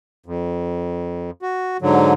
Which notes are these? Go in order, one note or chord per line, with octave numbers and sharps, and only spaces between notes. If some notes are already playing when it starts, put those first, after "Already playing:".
F2
F#4
G#2 D3 F#3